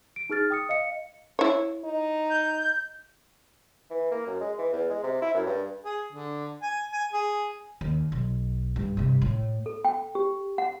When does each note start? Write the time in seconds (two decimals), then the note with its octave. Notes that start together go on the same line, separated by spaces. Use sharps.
0.16 D7
0.30 D#4 G#4 F6 A6
0.50 G5 D#6 C#7
0.69 D#5 F5 C#7
1.39 E4 C#5
1.84 D#4
2.30 G6
3.90 E3
4.11 A#3
4.26 F#2
4.41 G#3
4.58 E3
4.73 E2
4.90 G#3
5.03 C3
5.22 E4
5.34 F#2
5.46 G2
5.85 G#4
6.13 D3
6.62 G#5
6.92 G#5
7.12 G#4
7.81 D#2
8.12 B1
8.76 G2
8.97 G2 C3
9.22 A2
9.66 A4
9.85 G5
10.15 G4
10.58 F#5